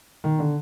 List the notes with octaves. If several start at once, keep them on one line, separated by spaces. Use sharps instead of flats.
D#3
D3